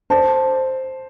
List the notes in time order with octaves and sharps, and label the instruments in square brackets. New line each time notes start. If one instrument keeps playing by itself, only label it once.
[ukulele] A4 D5 A5 [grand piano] C5